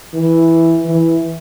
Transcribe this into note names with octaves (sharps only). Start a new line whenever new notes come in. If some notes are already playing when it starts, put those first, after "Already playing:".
E3
E3